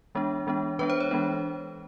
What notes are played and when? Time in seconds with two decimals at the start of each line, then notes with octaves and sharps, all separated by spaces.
0.15 E3 G#3 B3 D4
0.47 E3 G#3 B3 D4
0.79 E3 G#3 B3 D4 B4
0.90 C5
1.00 C#5
1.11 E3 G#3 B3 D4